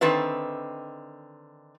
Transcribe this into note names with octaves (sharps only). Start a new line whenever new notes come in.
D3 D#3 C4 B4 E5